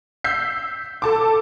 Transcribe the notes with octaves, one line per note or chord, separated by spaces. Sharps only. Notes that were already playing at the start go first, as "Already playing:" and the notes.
E6 G6 B6 C7
A4 A5 D6